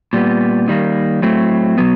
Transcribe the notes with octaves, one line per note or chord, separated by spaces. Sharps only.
A#2 G3 B3
D#3 G3 A#3
A2 F#3 A3 C4
B2 F#3 B3